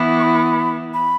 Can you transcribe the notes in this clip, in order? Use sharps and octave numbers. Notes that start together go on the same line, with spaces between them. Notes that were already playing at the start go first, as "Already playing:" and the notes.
Already playing: E3 B3 E4
C#6
B5
B5